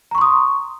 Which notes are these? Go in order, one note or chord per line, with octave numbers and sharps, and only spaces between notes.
A#5 C6 C#6 D#6